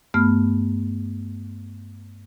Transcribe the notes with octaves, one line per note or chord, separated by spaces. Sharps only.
G2 A3 B3 F6